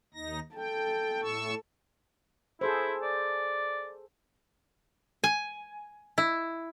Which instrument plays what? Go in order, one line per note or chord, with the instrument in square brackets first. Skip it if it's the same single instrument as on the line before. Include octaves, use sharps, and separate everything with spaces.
[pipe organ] D#2 D#4 A#6
[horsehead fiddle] A4 [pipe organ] G5
[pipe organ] A2 C#6 E6
[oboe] E4 [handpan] G#4 A4 C5
[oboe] D5
[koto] G#5
E4